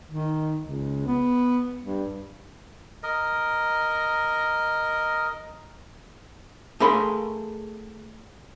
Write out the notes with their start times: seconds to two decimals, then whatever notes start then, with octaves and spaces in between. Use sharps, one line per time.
0.11 D#3
0.61 C#2
1.06 B3
1.82 G2
3.03 A#4 D#5
6.80 A3 G#4 A#4 F5 B5 C6